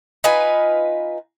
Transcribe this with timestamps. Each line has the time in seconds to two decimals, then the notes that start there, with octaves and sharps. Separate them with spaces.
0.24 D#4 F4 B4 G#5